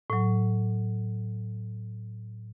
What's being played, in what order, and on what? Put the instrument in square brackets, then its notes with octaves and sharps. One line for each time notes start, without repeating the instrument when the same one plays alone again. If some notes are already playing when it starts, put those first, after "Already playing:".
[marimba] A2 F#3